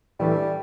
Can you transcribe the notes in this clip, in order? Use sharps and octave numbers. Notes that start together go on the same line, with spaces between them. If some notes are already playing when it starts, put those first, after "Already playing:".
A2 E3 G3 A3 D4